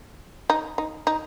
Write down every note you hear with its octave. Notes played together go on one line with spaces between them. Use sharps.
D#4
D#4
D#4